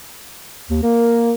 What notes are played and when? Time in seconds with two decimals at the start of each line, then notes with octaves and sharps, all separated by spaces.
0.70 D#2
0.83 A#3 A#4